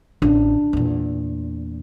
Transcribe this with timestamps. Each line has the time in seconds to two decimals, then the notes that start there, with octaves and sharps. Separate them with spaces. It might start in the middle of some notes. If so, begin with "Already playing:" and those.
0.22 A1 D4
0.73 E2 A#2